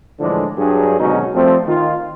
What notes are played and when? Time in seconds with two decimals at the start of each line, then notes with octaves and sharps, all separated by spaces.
0.20 A2 D3 E3 F3 G#3 D4
0.58 G2 F#3 G#4
0.99 G#1 B2 D3 F#3 C#4 D#4
1.35 F3 G3 A3 C4
1.67 D#3 F4